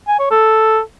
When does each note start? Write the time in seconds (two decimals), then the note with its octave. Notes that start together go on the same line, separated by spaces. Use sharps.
0.08 G#5
0.19 C#5
0.31 A4